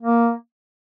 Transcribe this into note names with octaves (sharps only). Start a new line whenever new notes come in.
A#3